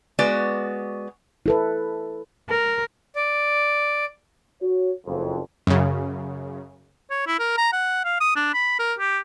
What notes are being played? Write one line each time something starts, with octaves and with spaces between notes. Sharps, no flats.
G#3 B3 F#4 D5
E4 A4 B4
A#4
D5
F#4 C#5
F#1 F2
F#2 C#3
C#5
E4
A#4
A#5
F#5
F5
D#6
D4
B5
A#4
G4